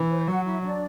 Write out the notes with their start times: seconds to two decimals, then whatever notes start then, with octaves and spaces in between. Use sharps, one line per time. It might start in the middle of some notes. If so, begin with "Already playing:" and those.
Already playing: E3
0.10 C5
0.27 F#3 F#4 F#5
0.45 E4 E5
0.62 D4 D5